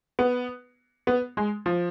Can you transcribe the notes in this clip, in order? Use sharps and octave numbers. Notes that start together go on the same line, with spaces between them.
B3
B3
G#3
F3